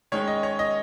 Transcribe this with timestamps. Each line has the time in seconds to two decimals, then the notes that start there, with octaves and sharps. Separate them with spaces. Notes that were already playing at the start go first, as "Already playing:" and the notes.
0.12 D#3 G#3 C#4 C#5
0.28 D#5
0.43 C#5
0.59 D#5